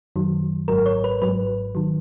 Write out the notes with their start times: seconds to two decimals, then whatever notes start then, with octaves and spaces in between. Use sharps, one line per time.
0.16 F#2 D#3 F#3
0.68 G#1 G#2 F#3 A#4
0.86 C#5
1.04 B4
1.22 G#1 G#2 F#3 B4
1.75 D#3 F#3